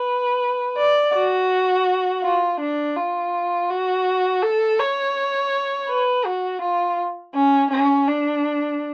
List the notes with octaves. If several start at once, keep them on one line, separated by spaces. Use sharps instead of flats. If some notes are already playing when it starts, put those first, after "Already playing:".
Already playing: B4
D5
F#4
F4
D4
F4
F#4
A4
C#5
B4
F#4
F4
C#4
C#4
D4